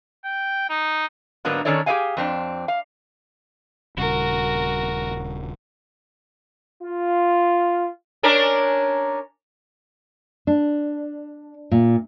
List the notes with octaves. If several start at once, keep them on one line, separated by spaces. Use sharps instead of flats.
G5
D#4
G#2 D3 F#3 A#3 B3 D4
D#3 C#4 D4 A4 C#5 D5
G4 G#4 B4 D#5 F5 G#5
F2 C4 D4
F5
D#1 C#3 G3 F#4 A#4
F4
C#4 D4 A#4
D4
A#2